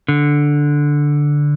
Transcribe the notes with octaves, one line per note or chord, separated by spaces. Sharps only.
D3